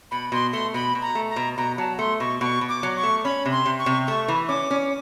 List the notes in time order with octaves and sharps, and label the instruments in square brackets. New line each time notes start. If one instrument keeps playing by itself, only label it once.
[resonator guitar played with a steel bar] B2 [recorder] B5
[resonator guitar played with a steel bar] B2 [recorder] C6
[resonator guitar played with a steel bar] A3 [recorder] C6
[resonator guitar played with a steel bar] B2 [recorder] B5
[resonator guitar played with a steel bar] B2
[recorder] A#5
[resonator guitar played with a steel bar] A3
[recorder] A#5
[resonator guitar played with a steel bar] B2
[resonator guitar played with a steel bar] B2 [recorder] A#5
[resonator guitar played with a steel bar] F#3 [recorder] A5
[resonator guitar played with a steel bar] A3 [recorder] C6
[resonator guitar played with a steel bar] B2 [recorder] C#6
[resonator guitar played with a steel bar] B2 [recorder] C#6
[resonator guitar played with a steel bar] B2
[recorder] D6
[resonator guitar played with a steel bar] F#3
[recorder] C#6
[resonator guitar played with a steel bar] A3
[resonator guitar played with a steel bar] C#4 [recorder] B5
[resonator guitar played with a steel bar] C3
[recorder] C6
[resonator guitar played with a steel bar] C3
[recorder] C#6
[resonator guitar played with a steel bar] C3
[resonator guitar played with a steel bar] A3 [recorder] C#6
[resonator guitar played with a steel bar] E3
[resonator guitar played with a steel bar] C#4 [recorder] D6
[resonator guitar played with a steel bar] C#4